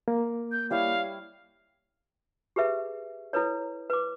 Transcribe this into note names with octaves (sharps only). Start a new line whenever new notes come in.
A#3
G6
G3 E4 C#5 F5
G4 G#4 B4 E5
E4 A4 B4 C#5
B4 D6